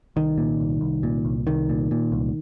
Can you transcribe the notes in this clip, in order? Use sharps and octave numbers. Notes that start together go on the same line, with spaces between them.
C2 D#3
A#2
C2
C2
A#2
C2
C2 D#3
A#2
A#2
C2